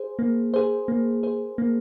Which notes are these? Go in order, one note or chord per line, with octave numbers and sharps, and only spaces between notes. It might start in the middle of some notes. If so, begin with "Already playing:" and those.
Already playing: G#4 C5
A#3
G#4 C5
A#3
G#4 C5
A#3